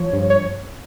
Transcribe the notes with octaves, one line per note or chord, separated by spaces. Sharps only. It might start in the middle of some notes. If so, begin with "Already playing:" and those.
Already playing: F3 C#5
G2
C#5